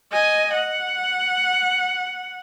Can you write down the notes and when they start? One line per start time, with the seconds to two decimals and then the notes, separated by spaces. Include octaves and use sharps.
0.12 D#5 G#5
0.53 F#5